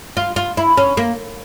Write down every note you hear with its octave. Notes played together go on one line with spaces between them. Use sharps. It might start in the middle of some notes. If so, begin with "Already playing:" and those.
F4
F4
E4
C#4
A#3